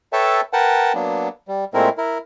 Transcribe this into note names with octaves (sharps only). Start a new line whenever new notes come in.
A4 B4 C#5 E5 G5 A5
A#4 B4 F#5 G5 A5
F#3 A#3 B3 D4
G3
A#2 G#3 A3 C4 E4 A#4
E4 A#4